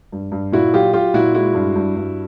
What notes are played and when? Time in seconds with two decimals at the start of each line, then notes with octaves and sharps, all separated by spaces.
0.12 G2
0.32 G2
0.52 A#2 E4 F#4
0.73 F#3 F4 G4
0.93 F#3 F4 G4
1.14 A#2 E4 F#4
1.34 G#3 E4 F#4
1.55 G2
1.76 G2
1.96 G2